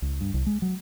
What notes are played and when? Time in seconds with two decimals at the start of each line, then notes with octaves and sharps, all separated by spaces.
0.02 C#2
0.21 G2
0.34 C2
0.46 G#3
0.62 F#3